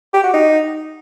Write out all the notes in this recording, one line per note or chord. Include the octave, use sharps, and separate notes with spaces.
G4
F#4
D#4